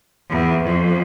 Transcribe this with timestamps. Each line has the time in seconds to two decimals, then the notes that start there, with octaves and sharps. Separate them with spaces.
0.30 E2
0.64 F2